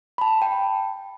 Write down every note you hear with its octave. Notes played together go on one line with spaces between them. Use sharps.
B5
A5
G5